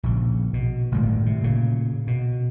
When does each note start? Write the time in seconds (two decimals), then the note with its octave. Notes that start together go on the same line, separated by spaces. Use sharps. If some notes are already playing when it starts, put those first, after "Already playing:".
0.03 A#1 C#3
0.54 B2
0.92 G1 A2 D#3 G3
1.26 C3
1.41 A#2 C#3
2.07 B2